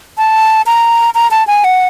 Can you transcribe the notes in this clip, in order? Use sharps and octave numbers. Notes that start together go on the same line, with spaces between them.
A5
A#5
A#5
A5
G#5
F#5